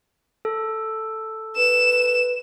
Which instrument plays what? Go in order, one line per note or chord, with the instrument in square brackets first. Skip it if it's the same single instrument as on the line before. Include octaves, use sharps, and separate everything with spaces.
[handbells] A4
[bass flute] B4 [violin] E7